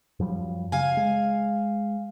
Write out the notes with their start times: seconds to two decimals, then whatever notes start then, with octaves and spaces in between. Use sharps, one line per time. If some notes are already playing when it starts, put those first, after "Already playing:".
0.19 F#2 F3 G3
0.72 C#3 F5 G#5
0.97 G#3